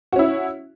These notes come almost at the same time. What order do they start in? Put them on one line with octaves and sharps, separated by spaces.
F#4 C#4 E4